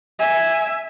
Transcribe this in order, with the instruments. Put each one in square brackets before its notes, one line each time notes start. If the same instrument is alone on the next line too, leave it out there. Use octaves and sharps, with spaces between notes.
[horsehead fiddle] E5 G#5